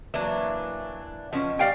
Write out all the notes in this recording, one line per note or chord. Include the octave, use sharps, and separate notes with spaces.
E3 F#3 A#3 D4
B2 F3 C#4
G3 D5 F5 G5 G#5